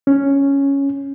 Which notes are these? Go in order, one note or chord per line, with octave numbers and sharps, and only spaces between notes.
C#4